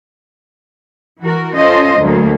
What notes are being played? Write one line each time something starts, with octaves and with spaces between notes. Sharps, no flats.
E3 F#4 A#4
C#4 F4 A4 C5 D#5
D2 F#3 A3 A#3